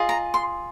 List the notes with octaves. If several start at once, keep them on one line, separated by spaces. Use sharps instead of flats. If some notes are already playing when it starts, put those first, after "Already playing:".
Already playing: F4 G#4 D#5
A#5
C6